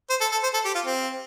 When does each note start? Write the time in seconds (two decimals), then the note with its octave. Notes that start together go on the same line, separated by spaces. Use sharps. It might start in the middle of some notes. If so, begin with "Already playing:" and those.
0.10 C5
0.21 A4
0.32 A4
0.43 C5
0.54 A4
0.65 G4
0.75 F4
0.86 C4